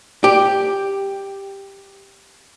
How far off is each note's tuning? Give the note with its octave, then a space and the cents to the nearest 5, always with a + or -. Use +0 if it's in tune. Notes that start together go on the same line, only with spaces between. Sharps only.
G4 +5 D5 +15